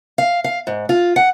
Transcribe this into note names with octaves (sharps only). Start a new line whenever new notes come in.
F5
F5
G#2
F4
F#5